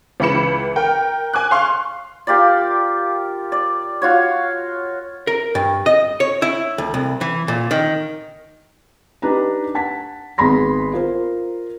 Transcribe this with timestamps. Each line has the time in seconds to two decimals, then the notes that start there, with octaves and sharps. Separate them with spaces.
0.20 C#2 E3 B5 C#7 E7
0.76 A#4 G5
1.33 G#5 D6 F#6
1.51 F5 C6 C#6
2.27 F4 G4 A#4 D5
3.52 D5
4.02 F4 F#4 C#5
5.27 A#4
5.55 G2
5.86 D#5
6.20 C#5
6.42 E4
6.78 D2
6.94 C2
7.21 E3
7.48 A#2
7.71 D#3
9.22 D4 D#4 G4 B4 A#5
9.75 F#5 A5 B6
10.38 G#1 B3 G#4 B5 C6 A#6
10.93 F4 A#4 C5